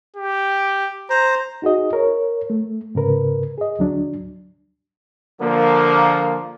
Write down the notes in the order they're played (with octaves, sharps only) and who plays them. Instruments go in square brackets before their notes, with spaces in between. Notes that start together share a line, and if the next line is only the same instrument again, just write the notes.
[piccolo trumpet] G4
[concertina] C5 [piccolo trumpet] A#5
[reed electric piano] D#4 F#4 G#4 D#5
A#4 C#5
A3
G#2 C#3 A#4 B4
G#4 D#5
D2 F#3 D4
[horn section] D3 F3 A#3